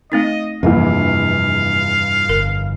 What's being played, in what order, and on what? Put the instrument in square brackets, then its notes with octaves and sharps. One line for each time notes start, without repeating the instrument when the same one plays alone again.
[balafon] A3 C4 D#4 [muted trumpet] D#5
[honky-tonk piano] F1 A#1 E3 [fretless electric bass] G2 C3 [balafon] A#3 [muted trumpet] F5
[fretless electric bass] G1 [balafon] A#4